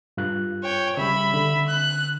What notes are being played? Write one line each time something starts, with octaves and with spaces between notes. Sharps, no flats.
G2 F4 F#6
C#5 G5
C#3 G3 E5 B5
D3
F#6